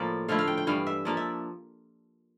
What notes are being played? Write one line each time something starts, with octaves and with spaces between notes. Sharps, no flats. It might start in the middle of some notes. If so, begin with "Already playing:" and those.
Already playing: A2 F3 A#3 D5
D3 F3 A3 E4 F5
F5
G5
G5
G2 E3 G3 F5
E5
F3 A#3 D4 D5
E5